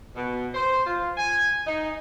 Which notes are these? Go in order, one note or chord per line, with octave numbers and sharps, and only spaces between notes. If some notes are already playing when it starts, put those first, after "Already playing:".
B2
C5
F4
G#5
D#4